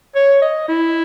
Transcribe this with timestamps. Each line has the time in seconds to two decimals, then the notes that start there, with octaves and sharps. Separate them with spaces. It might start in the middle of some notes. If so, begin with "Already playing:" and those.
0.15 C#5
0.42 D#5
0.68 E4